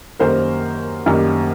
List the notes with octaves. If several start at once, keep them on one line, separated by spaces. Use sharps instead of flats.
F#2 D#3 G3 A#3 A#4 C5
F#2 D#3 G3 A#3